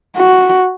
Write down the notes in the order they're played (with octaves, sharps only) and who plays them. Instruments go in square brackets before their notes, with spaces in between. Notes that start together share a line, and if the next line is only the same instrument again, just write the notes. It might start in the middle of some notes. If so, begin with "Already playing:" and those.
[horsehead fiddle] F#4